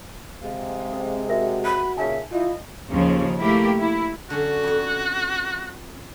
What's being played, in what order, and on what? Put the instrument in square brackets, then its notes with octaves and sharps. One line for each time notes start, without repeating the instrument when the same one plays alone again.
[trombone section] C3 G#3 [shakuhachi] F5
[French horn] C4 [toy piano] C#4 A4
[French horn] F#4 [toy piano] A#4 E5
[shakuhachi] B5
[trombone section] A#2 C#3 [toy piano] D#4 G#5 A5 [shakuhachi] E5
[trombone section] E4 [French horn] F4 [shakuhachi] D#5
[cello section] D#2 C#3 F3
A3 A#3 E4 G4
E4
[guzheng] D3 F#3 C#4 [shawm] F#4
[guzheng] F2 C#5